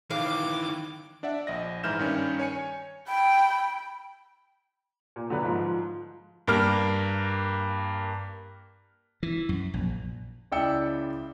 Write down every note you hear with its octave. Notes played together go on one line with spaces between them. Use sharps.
D#3 E3 F5 D6
D4 D5 E5 F#5
A#1 D#5 A#6
G#2 E3 E4 F6 G6 E7
G2 D#3 C#4
C#5 G#5 C#7
G5 B5
A#2
D3 F#3 B4
G#2 F3
G2 A#3 F6
E3
F#2
A#1
C#2 E4 D5 G5 E6 C#7